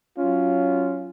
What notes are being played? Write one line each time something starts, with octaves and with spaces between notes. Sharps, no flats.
F#3 C#4 F4